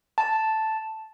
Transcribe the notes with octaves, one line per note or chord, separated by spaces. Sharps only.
A5